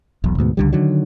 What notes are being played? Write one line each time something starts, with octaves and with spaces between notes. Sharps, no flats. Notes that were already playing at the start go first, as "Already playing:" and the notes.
E1 B1
D2 G#2 B2
C#2 D3 G3
D3 D#3 F#3